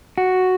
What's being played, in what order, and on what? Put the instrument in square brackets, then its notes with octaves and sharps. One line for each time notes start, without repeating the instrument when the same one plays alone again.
[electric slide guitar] F#4